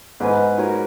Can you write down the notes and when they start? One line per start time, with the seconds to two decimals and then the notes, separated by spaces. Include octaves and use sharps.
0.20 G#2 B3 D#4 G#4 B4
0.58 D#4 F#4 A#4 C#5